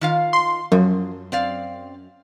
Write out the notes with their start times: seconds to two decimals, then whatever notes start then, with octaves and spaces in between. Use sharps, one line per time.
0.01 D#3 F4 F5
0.33 C6
0.72 F#2 F3
1.32 C4 D5 F5